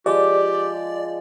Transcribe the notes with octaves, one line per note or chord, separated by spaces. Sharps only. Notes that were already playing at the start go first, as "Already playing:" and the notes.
F3 G#3 G4 D5 D6